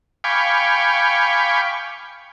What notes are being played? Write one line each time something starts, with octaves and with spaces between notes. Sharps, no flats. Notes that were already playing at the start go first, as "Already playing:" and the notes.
F5 G5 G#5 B5 C#6 D6